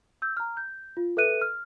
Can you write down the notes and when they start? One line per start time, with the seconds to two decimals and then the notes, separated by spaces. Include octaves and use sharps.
0.22 E6 G6
0.37 A#5 F6
0.57 G6
0.97 F4
1.17 A4 B4 E5 F#6 D#7
1.41 F6